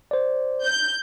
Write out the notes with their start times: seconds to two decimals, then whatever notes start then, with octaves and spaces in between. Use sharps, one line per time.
0.11 C5 D5
0.64 G6